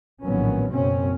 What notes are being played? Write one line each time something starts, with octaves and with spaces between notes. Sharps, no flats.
A#1 A2 D#3 F#3 B3 C#4
F#1 F#2 B2 C4 C#4